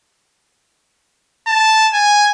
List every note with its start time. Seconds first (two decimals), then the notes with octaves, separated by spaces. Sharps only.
1.47 A5
1.94 G#5